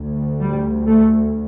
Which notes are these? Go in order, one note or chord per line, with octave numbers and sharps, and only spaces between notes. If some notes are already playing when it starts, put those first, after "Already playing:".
Already playing: D2
G3
A3